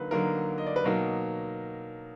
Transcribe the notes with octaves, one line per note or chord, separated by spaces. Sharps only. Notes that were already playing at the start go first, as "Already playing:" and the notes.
Already playing: D3 F#3 A#3 D#4 B4
D3 F#3 A#3 D#4 A#4
D#5
D5
B4
B2 F#3 A#3 D#4 A#4